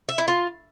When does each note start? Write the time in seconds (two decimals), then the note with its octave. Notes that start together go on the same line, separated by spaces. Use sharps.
0.09 E5
0.18 E4
0.28 F4